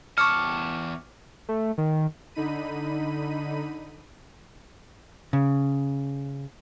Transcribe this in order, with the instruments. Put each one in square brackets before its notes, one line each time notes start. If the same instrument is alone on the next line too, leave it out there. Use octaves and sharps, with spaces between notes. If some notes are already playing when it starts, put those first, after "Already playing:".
[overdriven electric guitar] E2 A5 [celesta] C#6 D6 C#7 [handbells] F6
[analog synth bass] A3
D#3
[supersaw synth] D3 D#4 B5 D#7
[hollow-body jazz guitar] C#3